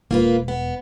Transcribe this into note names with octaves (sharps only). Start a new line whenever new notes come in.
E1 A#3 F4 B4
B3